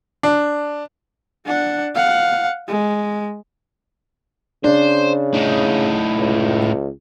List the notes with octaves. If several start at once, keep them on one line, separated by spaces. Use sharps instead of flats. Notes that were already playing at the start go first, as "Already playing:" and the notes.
D4
D4 F#5
F5 F#5
G#3
C#3 D4 C5
A2 D#4
C#2